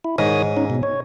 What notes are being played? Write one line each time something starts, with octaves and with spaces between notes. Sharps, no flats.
E4
G#2 D#3 C#5 D#6
C#4 D#4
B2
C#5